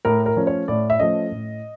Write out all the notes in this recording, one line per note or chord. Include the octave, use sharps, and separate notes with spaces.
A2 A#4
A#4
F3 A3 C#4
C#5
A2 D5
E5
F3 A3 C#4 D#5
A2